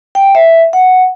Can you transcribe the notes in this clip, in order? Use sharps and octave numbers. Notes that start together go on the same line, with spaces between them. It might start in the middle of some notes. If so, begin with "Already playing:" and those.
G5
E5
F#5